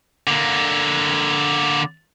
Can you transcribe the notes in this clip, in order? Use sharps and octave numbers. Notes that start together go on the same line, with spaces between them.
D3 A#3